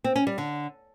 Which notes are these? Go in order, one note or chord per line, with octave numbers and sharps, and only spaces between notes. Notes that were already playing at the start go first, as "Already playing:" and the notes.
C4
C#4
G3
D3